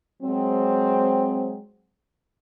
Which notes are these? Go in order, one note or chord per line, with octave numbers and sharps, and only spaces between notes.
F#3 G#3 C4